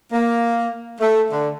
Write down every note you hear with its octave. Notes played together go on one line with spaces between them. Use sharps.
A#3
A3
D3